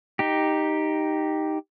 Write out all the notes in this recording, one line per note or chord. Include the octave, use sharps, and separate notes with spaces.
D#4 G4